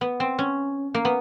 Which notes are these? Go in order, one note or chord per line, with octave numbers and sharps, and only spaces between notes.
B3
C4
C#4
A#3
B3